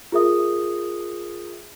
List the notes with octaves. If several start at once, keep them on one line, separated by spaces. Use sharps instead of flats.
F4 G#4 A#4 E5 D#6